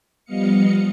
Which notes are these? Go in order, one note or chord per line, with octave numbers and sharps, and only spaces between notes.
F3 G3 B3 D#5 F5 C#7